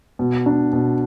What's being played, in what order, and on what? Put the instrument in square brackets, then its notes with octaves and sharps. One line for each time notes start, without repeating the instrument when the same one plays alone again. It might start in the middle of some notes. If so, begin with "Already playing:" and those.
[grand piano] B2
D4
B2